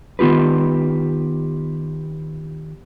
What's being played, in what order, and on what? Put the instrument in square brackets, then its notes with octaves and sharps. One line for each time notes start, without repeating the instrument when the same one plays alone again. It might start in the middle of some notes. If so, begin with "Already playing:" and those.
[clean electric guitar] D#3 B3 F4 G4 B4